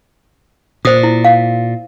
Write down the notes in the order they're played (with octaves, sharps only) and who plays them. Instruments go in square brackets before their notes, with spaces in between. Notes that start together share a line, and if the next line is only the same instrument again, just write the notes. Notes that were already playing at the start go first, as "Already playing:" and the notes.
[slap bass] A#2 [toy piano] C5 D#6
[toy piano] E4
F5